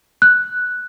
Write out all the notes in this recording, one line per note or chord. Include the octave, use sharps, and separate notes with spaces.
F#6